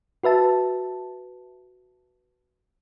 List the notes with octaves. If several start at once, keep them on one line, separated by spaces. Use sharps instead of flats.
F#4 B4 E5 A5